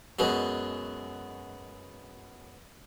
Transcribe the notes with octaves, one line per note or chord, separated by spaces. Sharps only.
F#2 B2 G#3